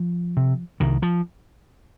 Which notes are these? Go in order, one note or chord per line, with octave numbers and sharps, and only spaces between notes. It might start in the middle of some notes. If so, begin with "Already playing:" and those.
Already playing: F3
C3
C2 D#3
F3